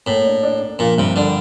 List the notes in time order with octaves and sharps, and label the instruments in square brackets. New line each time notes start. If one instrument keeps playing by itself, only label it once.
[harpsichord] A2 [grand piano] A#3
[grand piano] D4
D4
D4
[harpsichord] A#2 [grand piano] F3
[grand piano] G2 [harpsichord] C3
[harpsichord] D3 [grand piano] D4